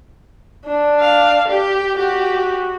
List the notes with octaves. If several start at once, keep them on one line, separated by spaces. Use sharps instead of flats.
D4
F5
G4
F#4 G4